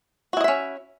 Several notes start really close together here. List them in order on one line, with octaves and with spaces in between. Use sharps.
F#4 E4 D#5 E5 C#4